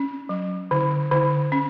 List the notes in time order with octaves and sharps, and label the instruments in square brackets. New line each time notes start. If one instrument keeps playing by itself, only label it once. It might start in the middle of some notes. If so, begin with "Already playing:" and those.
Already playing: [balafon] C#4
F#3
D3
D3
C#4